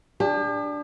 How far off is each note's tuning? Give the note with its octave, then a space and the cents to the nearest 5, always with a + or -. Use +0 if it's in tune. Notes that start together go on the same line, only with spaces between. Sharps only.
D4 +0 G4 +45